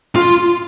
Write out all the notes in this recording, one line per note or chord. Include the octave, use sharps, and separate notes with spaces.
F4